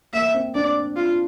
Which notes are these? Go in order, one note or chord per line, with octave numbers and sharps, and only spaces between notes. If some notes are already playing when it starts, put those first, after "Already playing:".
A#3 E5
C4
D4 D5
F4